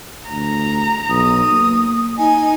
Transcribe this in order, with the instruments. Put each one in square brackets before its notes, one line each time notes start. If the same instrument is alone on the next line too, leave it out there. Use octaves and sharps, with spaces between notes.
[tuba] D2 [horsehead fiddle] A#5
[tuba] B1 [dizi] D#6
[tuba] A#3
[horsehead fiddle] D#4 [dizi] G#5